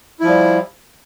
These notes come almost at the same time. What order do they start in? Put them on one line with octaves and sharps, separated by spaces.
E4 F3 G3